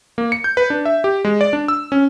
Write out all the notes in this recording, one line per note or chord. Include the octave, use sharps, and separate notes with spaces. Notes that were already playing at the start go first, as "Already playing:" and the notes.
A#3
C#7
G6
B4
D4
E5
G4
G#3
D5
D4
E6
C#4